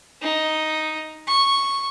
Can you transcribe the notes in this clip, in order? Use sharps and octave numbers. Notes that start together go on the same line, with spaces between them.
D#4
C#6